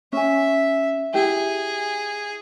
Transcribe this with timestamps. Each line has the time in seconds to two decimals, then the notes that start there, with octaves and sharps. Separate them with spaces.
0.13 C#4 E5 G#5
1.14 E4 G4 G#4 G5